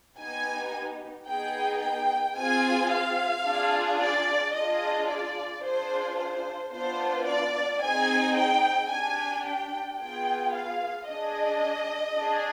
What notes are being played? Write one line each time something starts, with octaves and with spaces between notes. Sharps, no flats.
B3 D#4 G4 G#5
B3 D#4 G#4 G5
G5
C4 F4 G#4 G#5
F5
D4 F4 G#4
D5
D4 F4 G#4 D#5
D5
D4 F4 G#4 C5
C5
B3 D4 F4 C5
D5
C4 D#4 G#4 G#5
G5
D4 G4 G#5
G5
B3 F4 G#4 G5
F5
D4 G#4 D#5
D4 G#4